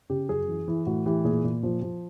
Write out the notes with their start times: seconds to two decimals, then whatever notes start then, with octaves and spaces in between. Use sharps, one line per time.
0.10 C#3 G4
0.29 F#2 G#4
0.48 E3
0.68 E3
0.87 A2 F#4
1.06 E3 G4
1.25 A#2 G#4
1.44 A#2
1.63 F3
1.82 F3